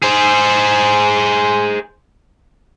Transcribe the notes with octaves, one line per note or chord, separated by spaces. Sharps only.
G#4 C5